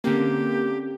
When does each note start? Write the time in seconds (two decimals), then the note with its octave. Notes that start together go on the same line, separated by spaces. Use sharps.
0.04 D3 A#3 C4 C#4 G4